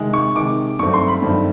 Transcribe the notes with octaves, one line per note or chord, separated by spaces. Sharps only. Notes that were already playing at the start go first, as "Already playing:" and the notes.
Already playing: C3 D#3 G#3
C#6
C3 D#3 G#3 D6
G2 D#3 F#3 A3 C4 C#6
C6
B5
G2 D#3 F#3 A3 C4